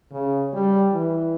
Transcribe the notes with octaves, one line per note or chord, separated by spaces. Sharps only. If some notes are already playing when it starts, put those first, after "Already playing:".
C#3
G3
E3